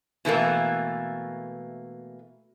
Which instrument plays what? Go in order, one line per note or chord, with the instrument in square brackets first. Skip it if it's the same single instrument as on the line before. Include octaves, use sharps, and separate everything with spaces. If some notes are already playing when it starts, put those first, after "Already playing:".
[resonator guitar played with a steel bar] B2 E3 A3 A#3